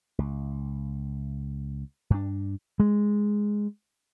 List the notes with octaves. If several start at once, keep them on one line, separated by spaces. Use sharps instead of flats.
C#2
G2 D4
G#3